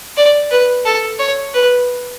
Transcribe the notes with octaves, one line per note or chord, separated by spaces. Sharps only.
D5
B4
A4
C#5
B4